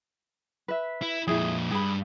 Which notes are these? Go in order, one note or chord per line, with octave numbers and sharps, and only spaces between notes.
B4 E5
E4
F2 A#2 E4 G#4
G2 G#4 B5